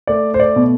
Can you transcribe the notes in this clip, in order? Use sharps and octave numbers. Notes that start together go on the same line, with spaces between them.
A3 D5
C5
D5
B2